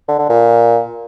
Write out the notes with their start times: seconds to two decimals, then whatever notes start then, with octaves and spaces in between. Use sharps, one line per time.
0.08 D3
0.19 D3
0.30 A#2